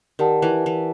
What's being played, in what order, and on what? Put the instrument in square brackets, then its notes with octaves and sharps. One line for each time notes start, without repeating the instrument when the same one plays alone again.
[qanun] D#3 [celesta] G4 A#4 D5 F#5 A5
[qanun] E3
E3